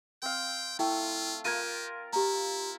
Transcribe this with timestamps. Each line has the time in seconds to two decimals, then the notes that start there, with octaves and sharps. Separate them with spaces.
0.22 C4 F5 G5
0.79 A3 E4 F4 G5
1.45 F4 G4 A#4 G#6 D#7
2.13 E4 G4 A#5